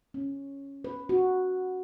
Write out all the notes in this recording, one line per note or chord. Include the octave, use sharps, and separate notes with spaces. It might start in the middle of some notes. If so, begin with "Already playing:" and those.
C#4
B4
F#4